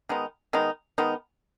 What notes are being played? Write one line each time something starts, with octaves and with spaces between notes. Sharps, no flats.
D#3 G#3 B3 D#4
D#3 G#3 B3 D#4
D#3 G#3 B3 D#4